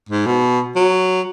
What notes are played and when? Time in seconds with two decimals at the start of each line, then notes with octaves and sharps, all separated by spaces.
0.09 G#2
0.26 B2
0.76 F#3